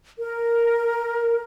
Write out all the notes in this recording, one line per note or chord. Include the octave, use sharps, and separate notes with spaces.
A#4